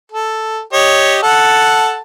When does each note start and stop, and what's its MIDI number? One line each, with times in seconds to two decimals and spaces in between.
0.12 0.61 69
0.73 1.18 67
0.73 1.18 73
0.73 1.18 75
1.23 1.99 69
1.23 1.99 78
1.23 1.99 81